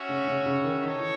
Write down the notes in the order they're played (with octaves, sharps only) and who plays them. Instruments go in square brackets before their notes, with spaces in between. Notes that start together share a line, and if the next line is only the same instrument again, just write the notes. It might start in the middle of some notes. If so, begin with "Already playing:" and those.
Already playing: [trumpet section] C#4 F#4 C#5 E5
[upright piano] C#3
C#3
C#3
D#3
[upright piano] D#3 [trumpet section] D#4 A4 C#5
[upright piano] E3